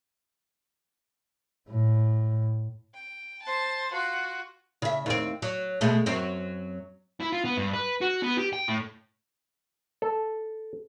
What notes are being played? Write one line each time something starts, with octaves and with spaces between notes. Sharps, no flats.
A2
G5
C5 A5
F4 F#4
C#3 E5
D#2 C4
F#3
B2 G#3 A3
F#2 F#3 C4
E4
F4
B3
G2
B4
F#4
B3
G4
G5
A2
A4